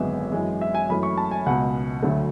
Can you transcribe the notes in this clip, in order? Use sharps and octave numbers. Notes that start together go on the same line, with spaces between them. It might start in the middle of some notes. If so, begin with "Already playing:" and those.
Already playing: G#1 F#2 D3 G#3 B3 E5
F#2 E3 G#3
E5
G#5
F#2 E3 A3 B5
C#6
A5
G#5
C#2 B2 G#3 F#5
D2 D3 F#3 A3